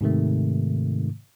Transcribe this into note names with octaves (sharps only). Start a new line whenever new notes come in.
G#2 C3 D#3 A3